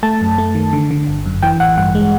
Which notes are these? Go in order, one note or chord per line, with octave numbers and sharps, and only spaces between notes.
A3 A5
F#2
A3
D#3
D3
D3
G1
F#2
E3 G5
A1 F#5
G2 F#5
G#3